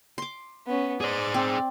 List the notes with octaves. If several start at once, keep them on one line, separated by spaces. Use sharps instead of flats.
C6 D6
B3 C#4
G#4 C5 D5
C4